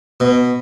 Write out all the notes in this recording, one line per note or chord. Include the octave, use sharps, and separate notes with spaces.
B2